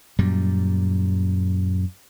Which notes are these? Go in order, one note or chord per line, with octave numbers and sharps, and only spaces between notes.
F#2 A#2 G3